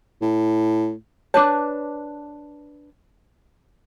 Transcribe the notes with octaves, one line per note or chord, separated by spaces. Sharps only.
A2
D4 B4 C#5 A5 D6